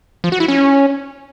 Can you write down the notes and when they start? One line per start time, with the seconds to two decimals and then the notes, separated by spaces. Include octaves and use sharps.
0.24 F3
0.32 F#4
0.40 E4
0.48 C#4